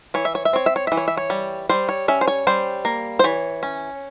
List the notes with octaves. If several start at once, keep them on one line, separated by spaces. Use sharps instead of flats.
E3 C#5
E5
C#5
E5
C4 C#5
E5
C#5
E3 E5
C#5
E5
C#5
G3
G3 C5
C#5
C#4 E5
C5
C#5
G3 C5
A#3
C5
E3 C#5
C#4